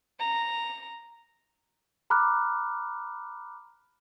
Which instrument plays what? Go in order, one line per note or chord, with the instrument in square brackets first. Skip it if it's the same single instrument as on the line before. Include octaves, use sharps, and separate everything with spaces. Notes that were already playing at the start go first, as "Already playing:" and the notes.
[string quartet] A#5
[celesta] A#5 B5 D6 F6 F#6